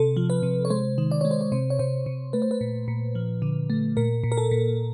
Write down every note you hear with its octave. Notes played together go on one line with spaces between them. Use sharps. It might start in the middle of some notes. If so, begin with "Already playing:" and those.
Already playing: C3 A4
F3
B4
C3
C#5
G#3 C5
D#3
D5
G#3 C#5
C5
C#5
C3 C5
C#5
C3 C5
C3
A3 B4
C5
B4
A#2
A#2
F3
D3
A3
A#2 A#4
A#2
A#4
A4
A#2